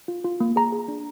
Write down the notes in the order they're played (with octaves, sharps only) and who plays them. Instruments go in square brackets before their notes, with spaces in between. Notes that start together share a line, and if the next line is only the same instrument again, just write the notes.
[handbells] F4
F4
A#3
G#4 A#5
G#4
D4